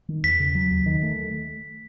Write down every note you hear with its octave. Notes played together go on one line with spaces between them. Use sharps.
D#3
E2 B6
C#3
F#3
D#2
D#3
A3